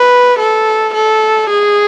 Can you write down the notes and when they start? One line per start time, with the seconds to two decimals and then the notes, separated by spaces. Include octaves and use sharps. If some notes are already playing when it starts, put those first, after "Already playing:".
Already playing: B4
0.39 A4
0.94 A4
1.50 G#4